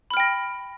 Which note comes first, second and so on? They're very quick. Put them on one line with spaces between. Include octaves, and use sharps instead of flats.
B5 F6 G5 A#6